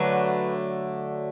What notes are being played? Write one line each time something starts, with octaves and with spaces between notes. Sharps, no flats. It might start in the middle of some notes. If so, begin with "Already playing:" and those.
Already playing: D3 F#3 A3 B4